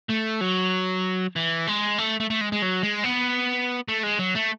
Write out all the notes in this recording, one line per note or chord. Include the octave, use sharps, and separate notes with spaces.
A3
F#3
E3
G#3
A3
A3
A3
G#3
G#3
F#3
G#3
B3
A3
G#3
F#3
A3